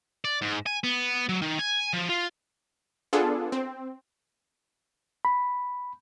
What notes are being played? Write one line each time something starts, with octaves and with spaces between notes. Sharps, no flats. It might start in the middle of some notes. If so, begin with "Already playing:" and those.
D5
G#2
G#5
B3
F#3
D#3
G#5
F3
F4
B3 D4 F4 G#4 A4
C4
B5